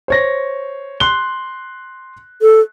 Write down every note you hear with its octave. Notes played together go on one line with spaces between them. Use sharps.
C5 C#5 A#6
C6 F#6 G7
A4